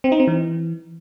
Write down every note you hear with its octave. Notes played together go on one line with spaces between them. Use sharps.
C4
D#4
C4
E3